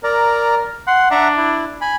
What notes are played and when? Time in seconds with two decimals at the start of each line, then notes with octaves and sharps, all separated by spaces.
0.04 A#4 D5 A#5
0.87 F#5 C6
1.11 D4 E5 F#5 A#5
1.37 E4
1.81 G#5 B5